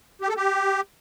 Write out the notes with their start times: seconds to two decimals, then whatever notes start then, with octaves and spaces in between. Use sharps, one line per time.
0.21 G4
0.29 A4
0.36 G4